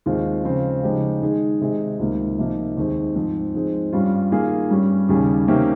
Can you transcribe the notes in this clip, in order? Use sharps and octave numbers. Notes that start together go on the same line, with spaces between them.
D#2 D#3 G#3 C4 F4
C#3 F3 G#3 C4 F4
C#3 F3 G#3 D#4 G4
D#3 G#3 D#4 G#4
C3 D#3 G#3 D#4 G#4
C#2 C3 D#3 A#3
C3 F3 A#3 D#4
D#2 D#3 G#3 C4
G#2 F3 C4
G#2 F3 G#3 C4
G2 G3 C#4 F4
D#3 A#3 F4 G#4
G2 G3 C#4
D#2 C#3 G3 C#4 G#4
C3 D#3 A#3 C#4 G4